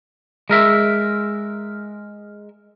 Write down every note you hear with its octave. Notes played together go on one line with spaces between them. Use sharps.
G#3 A#4 E5